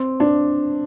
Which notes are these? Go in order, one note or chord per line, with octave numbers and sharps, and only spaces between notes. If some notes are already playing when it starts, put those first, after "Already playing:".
Already playing: C4
D4